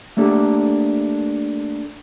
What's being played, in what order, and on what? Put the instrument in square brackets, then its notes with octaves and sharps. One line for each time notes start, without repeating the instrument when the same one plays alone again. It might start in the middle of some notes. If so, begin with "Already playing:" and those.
[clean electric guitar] A3 A#3 D4 G4 A4